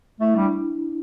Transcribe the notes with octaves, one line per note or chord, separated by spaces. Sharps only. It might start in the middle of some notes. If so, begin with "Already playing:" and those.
A3 E4
G3 D4